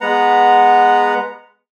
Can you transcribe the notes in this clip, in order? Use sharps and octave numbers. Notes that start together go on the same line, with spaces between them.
G#3 B3 B4 F#5 A#5